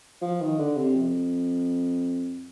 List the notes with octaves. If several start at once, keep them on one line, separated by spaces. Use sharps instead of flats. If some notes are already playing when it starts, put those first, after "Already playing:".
F3
D#3
D3
C3
F2